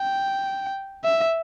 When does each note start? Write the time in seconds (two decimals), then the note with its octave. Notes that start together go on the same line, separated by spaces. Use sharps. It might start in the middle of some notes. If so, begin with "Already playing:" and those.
Already playing: G5
1.04 E5